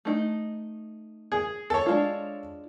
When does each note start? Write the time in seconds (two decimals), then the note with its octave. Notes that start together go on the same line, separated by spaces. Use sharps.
0.05 A3 D#4
1.32 G#4
1.70 A4 C#5
1.86 G#3 D4 F4